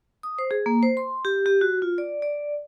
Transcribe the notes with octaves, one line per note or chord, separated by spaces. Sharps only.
D#6
C5
G#4
A#3
C5
C6
G4
G4
F#4
F4
D5
D5